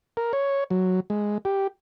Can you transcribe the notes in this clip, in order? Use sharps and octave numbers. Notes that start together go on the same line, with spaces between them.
A#4
C#5
F#3
G#3
G4